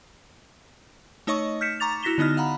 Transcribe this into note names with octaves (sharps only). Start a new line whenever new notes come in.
A3 D#4 C#5 D#5 C#6
F6 G6 B6 C#7 E7
A#5 C#6 D6 A6 F7
E4 F#4 A#6 B6 E7 G7
D3 B3 D#4 D#5 F6
F5 F#5 A#5 B5